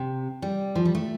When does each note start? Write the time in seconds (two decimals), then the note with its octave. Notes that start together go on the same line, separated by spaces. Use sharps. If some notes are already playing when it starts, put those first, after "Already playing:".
Already playing: C3
0.42 G3
0.75 F3
0.85 G3
0.95 A3